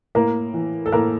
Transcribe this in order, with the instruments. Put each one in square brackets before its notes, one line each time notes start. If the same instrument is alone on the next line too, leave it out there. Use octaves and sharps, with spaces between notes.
[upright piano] A2 A#3 A#4
E3
A4
A2 A#3 A#4